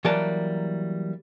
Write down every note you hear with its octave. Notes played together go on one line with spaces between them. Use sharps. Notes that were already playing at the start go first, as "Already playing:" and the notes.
E3 F#3 G3 A#3 A#4 A5